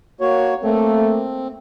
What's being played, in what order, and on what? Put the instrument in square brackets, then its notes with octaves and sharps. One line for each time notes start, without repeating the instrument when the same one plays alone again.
[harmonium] A#3 F#4 C#5
[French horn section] A3 A#3 [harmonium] C4